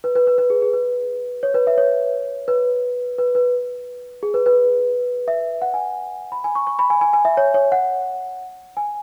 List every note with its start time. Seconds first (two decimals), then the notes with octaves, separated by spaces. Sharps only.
0.04 B4
0.16 B4
0.27 B4
0.38 B4
0.50 G#4
0.62 G#4
0.73 B4
1.43 C#5
1.54 B4
1.67 E5
1.78 C#5
2.48 B4
3.18 B4
3.35 B4
4.23 G#4
4.34 B4
4.46 B4
5.28 E5
5.62 F#5
5.74 G#5
6.32 B5
6.44 G#5
6.55 C#6
6.67 C#6
6.79 B5
6.90 G#5
7.01 G#5
7.13 G#5
7.25 E5
7.37 C#5
7.54 C#5
7.72 F#5
8.77 G#5